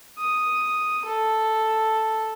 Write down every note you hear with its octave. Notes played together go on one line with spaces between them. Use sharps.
D#6
A4